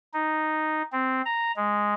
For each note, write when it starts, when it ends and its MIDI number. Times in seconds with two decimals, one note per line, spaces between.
0.13 0.82 63
0.93 1.22 60
1.25 1.52 82
1.56 1.94 56